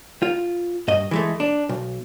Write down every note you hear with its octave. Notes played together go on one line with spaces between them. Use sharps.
F4
G2 D#5
E3 G#3 A3
D4
B1